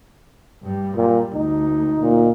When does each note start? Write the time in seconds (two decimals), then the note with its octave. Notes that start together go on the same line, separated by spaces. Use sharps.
0.63 G2 G3
0.96 A#2 G3
1.34 D2 D#4
2.00 A#2